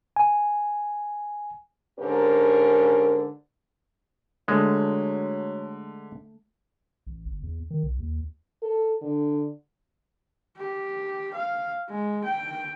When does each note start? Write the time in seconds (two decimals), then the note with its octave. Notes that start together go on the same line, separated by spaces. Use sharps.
0.16 G#5
2.00 G#2 D3 C#4 G4 A#4
4.48 D3 F#3 G#3 A3
7.07 A1
7.26 G1
7.43 E2
7.70 D#3
7.83 B1
7.99 D#2
8.62 A4
9.02 D3
10.58 G4
11.34 F5
11.89 G#3
12.25 G5